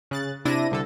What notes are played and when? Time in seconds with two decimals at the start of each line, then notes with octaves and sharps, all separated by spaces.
0.11 C#3 F#6 A6
0.45 C3 D4 E4 A#6 D#7
0.71 C2 D3 A4